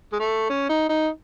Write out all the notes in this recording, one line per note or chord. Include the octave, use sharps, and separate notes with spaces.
G#3
A3
C#4
D#4
D#4